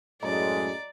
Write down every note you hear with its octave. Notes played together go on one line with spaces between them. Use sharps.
F#2 A2 G#3 D5 D#5 A#5